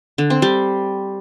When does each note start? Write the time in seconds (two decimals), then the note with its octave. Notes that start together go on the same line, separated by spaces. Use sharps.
0.18 D3
0.30 C4
0.42 G3